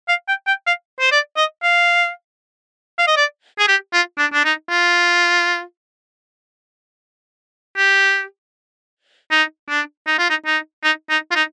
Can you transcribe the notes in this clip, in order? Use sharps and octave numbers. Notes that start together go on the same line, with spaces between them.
F5
G5
G5
F5
C5
D5
D#5
F5
F5
D#5
D5
G#4
G4
F4
D4
D4
D#4
F4
G4
D#4
D4
D#4
F4
D#4
D#4
D#4
D#4
F4
D#4